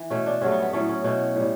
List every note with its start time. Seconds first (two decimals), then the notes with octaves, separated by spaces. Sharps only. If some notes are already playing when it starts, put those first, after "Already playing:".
Already playing: E3
0.10 B2 A3 C#4
0.26 D4
0.41 G2 F#3 A3 C#4
0.52 B3
0.62 B3
0.73 A2 F#3 A3 C#4
0.89 C#4
1.04 B2 A3 C#4
1.36 A2 G3